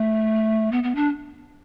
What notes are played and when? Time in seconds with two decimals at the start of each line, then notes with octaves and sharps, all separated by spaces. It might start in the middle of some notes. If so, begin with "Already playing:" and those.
Already playing: A3
0.72 B3
0.83 B3
0.95 D4